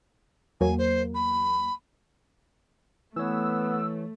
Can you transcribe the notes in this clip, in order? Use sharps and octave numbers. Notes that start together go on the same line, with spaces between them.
E2 F#3 A#3 G#5
C5
B5
E3 A3 B3 C#5 E6